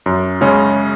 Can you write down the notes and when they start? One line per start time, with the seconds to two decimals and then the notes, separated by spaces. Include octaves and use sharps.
0.06 F#2
0.41 C#3 G#3 C#4